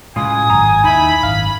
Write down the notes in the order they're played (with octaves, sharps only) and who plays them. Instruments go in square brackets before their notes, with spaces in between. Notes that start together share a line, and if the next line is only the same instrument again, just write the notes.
[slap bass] A2 [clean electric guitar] C#3 G#3 F4 [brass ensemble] G#5 [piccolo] D#6
[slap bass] G#1 F#2 [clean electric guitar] A#5
[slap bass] D#2 D#3 [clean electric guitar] D#4 E4 [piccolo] B5
[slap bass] G#1 F#2 [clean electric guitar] F5